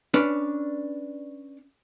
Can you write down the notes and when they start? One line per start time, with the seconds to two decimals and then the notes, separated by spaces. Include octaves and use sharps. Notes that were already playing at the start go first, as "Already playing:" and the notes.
0.14 C#4 D4 B4 D5